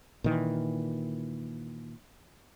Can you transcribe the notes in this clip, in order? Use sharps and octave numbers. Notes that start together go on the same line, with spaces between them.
A#2 D#3 E3